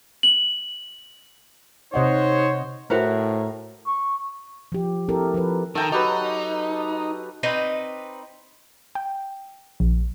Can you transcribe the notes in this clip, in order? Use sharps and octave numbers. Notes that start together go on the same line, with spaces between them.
F#7
C3 D#4 C5 C#5 D#5 F#5
A2 E4 F#4 A#4 C5 A#5
C#6
F3 G4
C4 E4 G4 A4 A#4
F3 G4 A4 B4
D#3 A4 G5 A#5
F#3 D#4 G4 B4
C4 D#4 B4 D5
G5
A#1